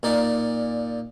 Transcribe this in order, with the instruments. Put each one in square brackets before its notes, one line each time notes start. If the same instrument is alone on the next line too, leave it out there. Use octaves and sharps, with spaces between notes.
[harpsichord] A#2 D#4 D5